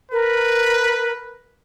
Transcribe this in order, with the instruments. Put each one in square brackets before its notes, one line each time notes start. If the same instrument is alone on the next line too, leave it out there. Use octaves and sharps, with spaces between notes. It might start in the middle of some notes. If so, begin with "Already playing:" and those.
[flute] A#4 [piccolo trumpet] B4